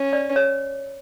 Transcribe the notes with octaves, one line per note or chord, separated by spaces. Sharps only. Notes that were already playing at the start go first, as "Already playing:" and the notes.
Already playing: C#4
D5
C#5